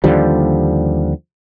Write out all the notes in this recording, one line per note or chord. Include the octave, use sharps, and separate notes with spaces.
D#2 D3 F3 G3